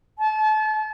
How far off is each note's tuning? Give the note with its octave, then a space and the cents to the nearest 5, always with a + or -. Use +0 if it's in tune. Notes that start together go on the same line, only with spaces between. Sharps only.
A5 -35